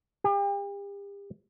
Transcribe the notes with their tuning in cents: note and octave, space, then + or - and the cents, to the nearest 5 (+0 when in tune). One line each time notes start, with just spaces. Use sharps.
G4 +40